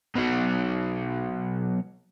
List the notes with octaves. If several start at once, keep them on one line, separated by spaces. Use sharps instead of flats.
B2 F#3